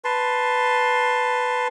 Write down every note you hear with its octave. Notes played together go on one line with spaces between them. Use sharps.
B4 A5 C6